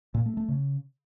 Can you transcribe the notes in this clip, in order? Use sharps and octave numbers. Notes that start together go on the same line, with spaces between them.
A#2
A3
A3
C#3